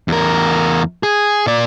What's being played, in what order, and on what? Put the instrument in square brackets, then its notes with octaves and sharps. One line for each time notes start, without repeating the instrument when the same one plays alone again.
[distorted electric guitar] E2 A#4
G#4
A#2 D5